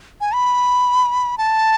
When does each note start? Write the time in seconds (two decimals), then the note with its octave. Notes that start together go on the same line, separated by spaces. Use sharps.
0.21 G#5
0.34 B5
1.38 A5